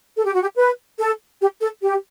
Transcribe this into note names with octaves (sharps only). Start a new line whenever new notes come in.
A4
G4
F#4
G4
B4
A4
G4
A4
G4